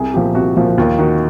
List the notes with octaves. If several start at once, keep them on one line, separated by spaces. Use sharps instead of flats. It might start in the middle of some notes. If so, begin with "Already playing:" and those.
Already playing: C2 G#4
A#2 F3 G4
C2 F#4
A#2 F3
D#2 F4
D#3 F#4